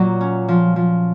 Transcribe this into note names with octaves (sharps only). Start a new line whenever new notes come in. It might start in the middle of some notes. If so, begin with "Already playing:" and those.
Already playing: A#2 F#3
C#4
F3
F3